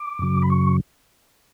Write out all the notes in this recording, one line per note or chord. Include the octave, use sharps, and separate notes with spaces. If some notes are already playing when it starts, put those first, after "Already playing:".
Already playing: D6
F#2 C#3 F#3
B5
C#6